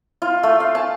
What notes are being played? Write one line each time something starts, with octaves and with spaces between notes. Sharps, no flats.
F4
A3
F5
A5